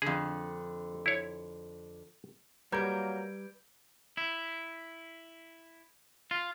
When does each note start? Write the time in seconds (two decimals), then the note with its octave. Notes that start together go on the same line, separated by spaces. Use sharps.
0.02 F2 D3 G#4
1.06 E4 C#5
2.72 F#3 G3 A#3 B4 A#5 G6 G#6 D7
4.17 E4
6.31 F4